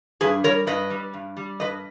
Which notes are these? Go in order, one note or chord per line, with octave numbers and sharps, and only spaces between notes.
G2 G#4 B4
G3 A#4 C#5
G2 B4 D#5
G3
G2
G3
G2 B4 D#5